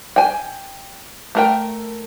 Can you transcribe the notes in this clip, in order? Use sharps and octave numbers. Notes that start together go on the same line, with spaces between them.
G5 G#5
A3 A#4 G5